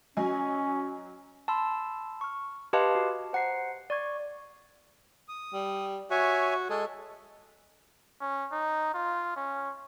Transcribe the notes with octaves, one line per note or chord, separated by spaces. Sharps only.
F#3 C#4 D#5 G#5
A5 B5 C6 E6
C#6 F6
G4 B4 D#5 F5 A5 C6
F#4
C5 F#5 A#5 C7
D5 C#6 G#6
D#6
G3
F#4 C#5 E5 G#5
G#3 A4
C#4
D#4
F4
C#4